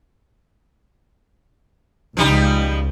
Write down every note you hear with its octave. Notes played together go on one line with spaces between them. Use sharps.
C#2 F3 G3 D#4